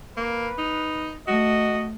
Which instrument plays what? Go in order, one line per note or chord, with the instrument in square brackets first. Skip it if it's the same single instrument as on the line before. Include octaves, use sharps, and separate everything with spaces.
[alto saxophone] A#3 [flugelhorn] B4
[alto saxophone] D#4
[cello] A3 [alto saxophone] F#4 [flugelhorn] D#5